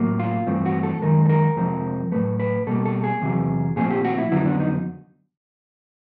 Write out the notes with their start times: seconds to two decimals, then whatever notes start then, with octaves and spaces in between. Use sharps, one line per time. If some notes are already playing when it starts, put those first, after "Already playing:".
Already playing: A2 F#3 A#3
0.19 F4
0.47 G2 E3 A3 C4
0.65 F#4
0.83 A4
1.02 F#2 D#3 G#3 A#4
1.26 A4
1.29 A#4
1.57 F2 C3 F3 G#3 C4
2.12 A2 F#3 A3 B4
2.40 B4
2.67 B2 G3 A#3 A4
2.85 A4
3.04 G#4
3.22 E2 C3 D#3 F#3
3.76 A#2 F3 A3 C4 G#4
3.90 G4
4.04 F#4
4.18 E4
4.32 F2 D3 F#3 B3 E4
4.45 D4
4.60 D#4